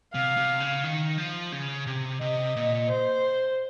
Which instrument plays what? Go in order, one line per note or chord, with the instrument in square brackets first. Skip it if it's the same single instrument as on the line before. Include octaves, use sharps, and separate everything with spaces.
[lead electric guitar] C3 [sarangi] F5
[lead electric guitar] C3
C#3
D#3
F3
C#3
C3
[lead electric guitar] C3 [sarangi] D#5
[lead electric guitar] A#2
[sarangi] C5